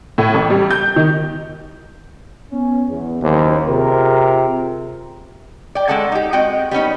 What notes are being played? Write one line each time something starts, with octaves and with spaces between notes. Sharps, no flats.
A2
A1
G3
G6
D#3
B3 C#4
E2
F#1 D#2 C5
C3 F4 G#4 A#4
D5 G5
G#3 C#4 A4 F#5 A5
D#4 G4
G#3 C4 F#4 D#5 G5
G3 B3 C#4 D#4